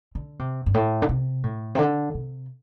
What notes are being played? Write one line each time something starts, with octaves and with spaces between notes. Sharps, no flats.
D3
C3
G2
A2
D3
C3
A2
C3
D3
C3